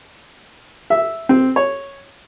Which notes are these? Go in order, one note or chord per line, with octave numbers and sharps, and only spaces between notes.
E5
C4
C#5